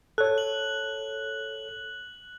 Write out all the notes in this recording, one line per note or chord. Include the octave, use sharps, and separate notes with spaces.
A4 C#5 F#6
F#7